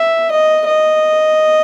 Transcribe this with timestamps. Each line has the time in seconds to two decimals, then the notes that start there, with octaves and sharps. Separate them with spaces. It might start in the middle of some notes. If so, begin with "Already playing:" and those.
Already playing: E5
0.31 D#5
0.67 D#5